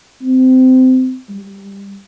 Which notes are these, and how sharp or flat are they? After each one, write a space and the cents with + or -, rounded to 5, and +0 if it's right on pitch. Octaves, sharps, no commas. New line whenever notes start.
C4 -25
G3 +10